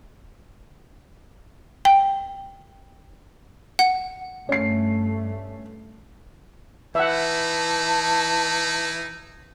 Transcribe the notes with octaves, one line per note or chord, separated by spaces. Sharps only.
G5
F#5
G2 A3 C#4 C7
E3 D#4 E4 E5 F#5 A5